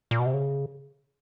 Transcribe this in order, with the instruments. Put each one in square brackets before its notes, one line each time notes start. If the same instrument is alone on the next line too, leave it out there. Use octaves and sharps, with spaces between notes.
[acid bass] A#2
B2
C3
C#3